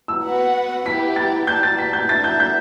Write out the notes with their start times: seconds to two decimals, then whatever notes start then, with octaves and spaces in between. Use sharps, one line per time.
0.08 E6
0.23 B3 F#4 B4 F#5
0.86 B3 E4 G4 B4 B6
1.16 A6
1.47 G4 D5 A5 G6
1.63 A6
1.78 B6
1.93 G6
2.09 D4 A4 E5 A6
2.24 G6
2.40 G6